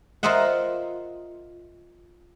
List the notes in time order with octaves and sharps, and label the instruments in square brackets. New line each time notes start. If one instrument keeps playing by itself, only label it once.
[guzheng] F4 A#4 C5 D#5 E5 F#5